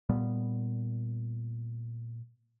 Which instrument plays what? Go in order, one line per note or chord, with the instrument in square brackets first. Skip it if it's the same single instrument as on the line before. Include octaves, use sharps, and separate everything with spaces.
[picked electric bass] A#2 G3 B3